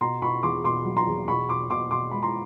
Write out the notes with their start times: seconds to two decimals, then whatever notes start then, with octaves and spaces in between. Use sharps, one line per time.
0.01 B2 A#5 C6
0.22 B2 B5 C#6
0.43 E2 C6 D6
0.64 B2 C6 D6
0.85 F#3
0.97 A#5 C6
1.07 E2
1.28 B2 B5 C#6
1.49 B2 C6 D6
1.70 B2 C6 D6
1.91 B2 C6 D6
2.11 G#3 B5
2.23 A#5 C6